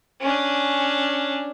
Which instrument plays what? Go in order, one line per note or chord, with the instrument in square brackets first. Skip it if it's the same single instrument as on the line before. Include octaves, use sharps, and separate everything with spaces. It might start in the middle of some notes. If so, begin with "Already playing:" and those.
[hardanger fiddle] C#4 D4